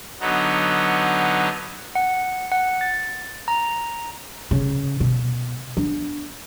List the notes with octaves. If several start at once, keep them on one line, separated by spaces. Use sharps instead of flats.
D3 F#3 B3 D#4
F#5
F#5
A6
A#5
C#3
B2
B3 D4